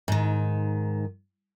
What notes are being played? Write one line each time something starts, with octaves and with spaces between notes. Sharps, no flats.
G#2 D#3